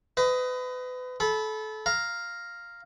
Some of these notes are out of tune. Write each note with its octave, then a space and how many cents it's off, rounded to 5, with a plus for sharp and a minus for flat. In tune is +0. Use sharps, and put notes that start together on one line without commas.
B4 +35 D#5 +10
A4 -25 B5 +0
F5 +0 A#5 +0